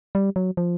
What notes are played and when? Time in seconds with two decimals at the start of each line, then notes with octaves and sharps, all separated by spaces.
0.15 G3
0.36 F#3
0.57 F3